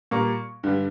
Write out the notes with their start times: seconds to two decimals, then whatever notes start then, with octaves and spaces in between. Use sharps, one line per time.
0.11 A#2 G3 A#3 C#6
0.63 G2 D3 G3